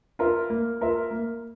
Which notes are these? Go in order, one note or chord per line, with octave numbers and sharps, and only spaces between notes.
F4 A#4 E5
A#3
F4 A#4 E5
A#3